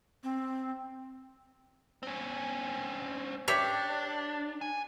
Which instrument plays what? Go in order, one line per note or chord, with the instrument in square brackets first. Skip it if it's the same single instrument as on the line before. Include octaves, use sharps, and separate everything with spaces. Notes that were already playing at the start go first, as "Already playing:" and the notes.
[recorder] C4
[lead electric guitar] C4 C#4
[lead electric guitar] D4 [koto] G4 C#5 E5
[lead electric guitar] G#5